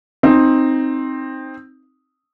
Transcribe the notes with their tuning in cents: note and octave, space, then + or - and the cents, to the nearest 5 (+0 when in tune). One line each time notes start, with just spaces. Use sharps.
C4 +10 D#4 +0